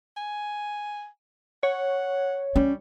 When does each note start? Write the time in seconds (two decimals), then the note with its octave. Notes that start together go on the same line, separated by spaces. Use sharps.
0.17 G#5
1.63 C#5 F#5
2.56 G3 C#4